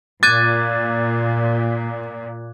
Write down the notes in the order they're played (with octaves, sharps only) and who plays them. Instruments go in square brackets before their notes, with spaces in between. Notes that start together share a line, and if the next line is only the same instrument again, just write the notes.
[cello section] A#2 [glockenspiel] D6 F#6 G#6 [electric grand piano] A6 D#7